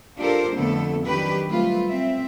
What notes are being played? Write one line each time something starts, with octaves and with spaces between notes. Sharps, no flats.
D4 F4 G4 A4 A#4 C5
F2 D3 A3 B3 A4
D#3 F#3 D4 G4 B4
F#3 G3 A3 C4 F4 B4
C4 E5